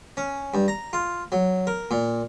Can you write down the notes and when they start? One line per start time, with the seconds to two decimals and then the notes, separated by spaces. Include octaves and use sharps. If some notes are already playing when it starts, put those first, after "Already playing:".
0.17 C#4
0.54 G2
0.68 A#5
0.93 F4
1.32 F#3
1.67 A#4
1.91 A#2